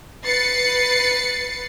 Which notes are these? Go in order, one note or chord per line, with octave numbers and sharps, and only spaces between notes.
B4 A6 C7 C#7